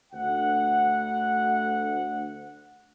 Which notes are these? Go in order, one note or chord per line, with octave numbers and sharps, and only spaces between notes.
D2 F#5